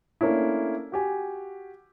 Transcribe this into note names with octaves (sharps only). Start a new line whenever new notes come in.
A3 A#3 C#4 D4 E4
F#4 G4 G#5